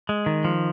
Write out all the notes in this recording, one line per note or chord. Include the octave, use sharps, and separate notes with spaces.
G#3
D#3
F3